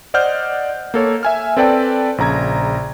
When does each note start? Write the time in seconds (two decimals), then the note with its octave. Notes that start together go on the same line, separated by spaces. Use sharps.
0.14 C5 D5 D#5 F#5 F6 G6
0.94 A#3 A4 C#5
1.23 E5 G#5 F6
1.57 C4 A4 B4 D5 G5 A5
2.18 A#1 C#3 A#5 G#6